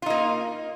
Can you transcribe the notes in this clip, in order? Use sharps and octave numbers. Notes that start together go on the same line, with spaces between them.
A#3 D#4 F4